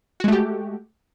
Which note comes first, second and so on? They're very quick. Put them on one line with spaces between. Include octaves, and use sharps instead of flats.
F#4 G#3 A3 G4